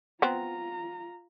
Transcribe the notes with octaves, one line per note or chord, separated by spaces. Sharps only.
B3 C4 F4 A#5